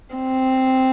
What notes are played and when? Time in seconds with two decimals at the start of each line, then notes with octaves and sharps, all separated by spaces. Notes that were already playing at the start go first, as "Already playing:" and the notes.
0.15 C4